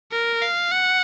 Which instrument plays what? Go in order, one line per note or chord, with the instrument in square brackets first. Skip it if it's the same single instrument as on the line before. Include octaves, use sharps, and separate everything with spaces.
[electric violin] A#4
F5
F#5